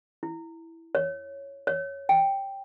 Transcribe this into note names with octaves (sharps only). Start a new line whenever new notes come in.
E4
C#5
C#5
G5